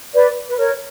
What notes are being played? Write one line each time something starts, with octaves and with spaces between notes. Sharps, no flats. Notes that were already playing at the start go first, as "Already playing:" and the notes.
B4 D5
B4
A#4 C#5